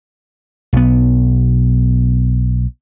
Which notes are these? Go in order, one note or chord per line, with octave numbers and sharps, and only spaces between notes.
B1 B3